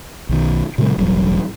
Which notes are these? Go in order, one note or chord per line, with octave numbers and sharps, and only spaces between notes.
B1 D#3
A#2 C#3 F#3 G#3
E1 A1 F#3 G3